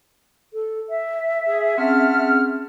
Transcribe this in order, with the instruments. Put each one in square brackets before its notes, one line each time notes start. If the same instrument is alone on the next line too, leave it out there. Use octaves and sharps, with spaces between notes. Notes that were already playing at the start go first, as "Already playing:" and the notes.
[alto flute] A4
E5
[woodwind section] G#4
[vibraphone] C4 C#4 G#4 [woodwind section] F#5 A5 F6